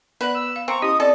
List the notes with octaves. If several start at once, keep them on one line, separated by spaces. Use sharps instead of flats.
B3 B4 D5 F#5 F#6
E6
F5
C4 A#5 C#6
C#4 E4 G4 D#5 D#6
C4 A4 D5